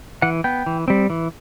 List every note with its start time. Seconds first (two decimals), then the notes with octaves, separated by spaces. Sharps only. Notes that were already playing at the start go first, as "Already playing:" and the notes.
0.22 E3 F#5
0.44 B3 G5
0.66 E3
0.88 G3 C4
1.10 E3